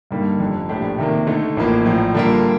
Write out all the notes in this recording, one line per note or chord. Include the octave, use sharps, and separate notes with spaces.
G2 D3 G3 A#3 D#4
F1 F2 D3
A#1 A2 A3 D4 G4
C3 D#3 A#3
D3 A3 D#4
A1 A2 F3 A#3
A#1 A2 F3
D3 G3 A#3 F4 A#4